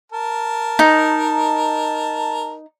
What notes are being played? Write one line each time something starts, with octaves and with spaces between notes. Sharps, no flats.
A#4 A5
D#4